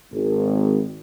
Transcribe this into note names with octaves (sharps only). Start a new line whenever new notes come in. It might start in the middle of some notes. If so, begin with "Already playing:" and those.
G#1